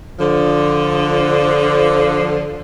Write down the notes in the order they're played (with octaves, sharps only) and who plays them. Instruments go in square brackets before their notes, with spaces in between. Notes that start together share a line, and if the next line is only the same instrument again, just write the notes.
[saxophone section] D3 F3